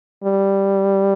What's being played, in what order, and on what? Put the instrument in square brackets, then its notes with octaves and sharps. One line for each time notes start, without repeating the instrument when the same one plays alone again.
[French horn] G3